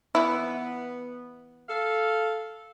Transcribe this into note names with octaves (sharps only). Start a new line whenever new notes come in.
E3 B3 E4
A4 F5